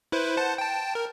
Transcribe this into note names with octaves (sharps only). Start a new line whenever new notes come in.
E4 B4 C5
C5 F#5 A5
G5 A5
A#4